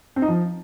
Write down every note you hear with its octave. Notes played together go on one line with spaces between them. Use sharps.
C4
D#4
F3